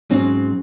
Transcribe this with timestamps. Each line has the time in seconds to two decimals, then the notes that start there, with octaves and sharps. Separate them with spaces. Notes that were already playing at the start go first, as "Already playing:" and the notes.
0.10 G#2 F#3 C4 C#4